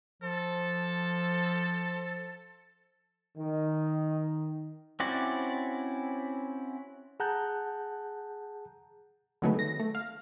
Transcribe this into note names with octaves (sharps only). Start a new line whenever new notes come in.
F3 A4
D#3
C4 C#4 E4 F#4 D5
G#4 F#5 A5 A#5 F#6 G6
D3 D#3 F#3 G#3 A3 B3
A#6
A3
F5